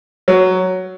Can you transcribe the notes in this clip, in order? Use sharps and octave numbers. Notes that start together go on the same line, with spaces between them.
F#3